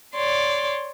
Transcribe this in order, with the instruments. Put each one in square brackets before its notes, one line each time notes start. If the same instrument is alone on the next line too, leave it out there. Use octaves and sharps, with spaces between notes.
[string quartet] C#5 D5 C6